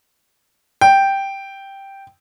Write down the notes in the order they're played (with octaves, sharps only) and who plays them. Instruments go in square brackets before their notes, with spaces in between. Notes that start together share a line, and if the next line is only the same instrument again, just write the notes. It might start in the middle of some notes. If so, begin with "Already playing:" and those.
[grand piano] G5